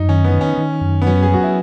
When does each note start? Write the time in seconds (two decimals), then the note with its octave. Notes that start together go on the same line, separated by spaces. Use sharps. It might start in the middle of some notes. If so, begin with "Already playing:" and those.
Already playing: F#2 D#4
0.09 D#3 C#4
0.24 B3
0.32 D#3
0.41 C#4
0.57 D#3
0.81 F#2
1.02 B3
1.07 F#3 C#4
1.22 G#4
1.31 F#3 F#4
1.44 E4